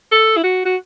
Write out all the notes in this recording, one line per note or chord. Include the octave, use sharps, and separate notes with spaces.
A4
E4
F#4
F#4